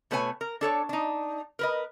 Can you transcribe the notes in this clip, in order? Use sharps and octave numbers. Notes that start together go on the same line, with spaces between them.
B2 A3 B4 C#5 G#5
A#4
D4 A4 C#5 D5
D4 D#4
A#4 B4 D#5